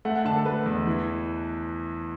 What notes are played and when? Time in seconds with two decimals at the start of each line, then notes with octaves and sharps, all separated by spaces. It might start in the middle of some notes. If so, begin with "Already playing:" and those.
0.05 A3 F#5
0.15 F#5
0.25 D3 A5
0.35 A4
0.45 A3 B4
0.66 E2
0.87 E3